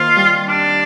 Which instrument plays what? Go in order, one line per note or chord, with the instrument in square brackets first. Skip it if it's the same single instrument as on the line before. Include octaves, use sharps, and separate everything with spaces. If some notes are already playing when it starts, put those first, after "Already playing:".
Already playing: [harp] D#3 A#3 C4 [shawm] F4
[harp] G3
[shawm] D4